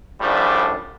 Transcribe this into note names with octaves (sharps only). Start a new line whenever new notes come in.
F#2 A2 F3 G3 D4 G#4